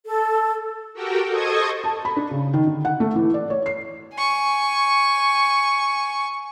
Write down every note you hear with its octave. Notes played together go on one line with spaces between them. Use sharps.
A4
F#4 G4 A4 A#4 G5
A4 C5 D#5 C#6 D#6 G#6
A5
B5
D4
C#3
D#3
D3
F#5
A3
E3
D5
C#5
C7
G#5 C#6